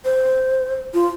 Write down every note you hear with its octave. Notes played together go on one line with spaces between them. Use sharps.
C5
F4